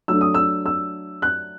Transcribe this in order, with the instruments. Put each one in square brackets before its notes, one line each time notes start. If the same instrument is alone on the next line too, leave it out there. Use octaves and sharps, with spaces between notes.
[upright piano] F#3 A3 D4 E6
D#6
E6
E6
F#6